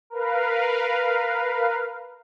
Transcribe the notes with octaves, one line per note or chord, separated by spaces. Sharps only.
A#4 B4 F5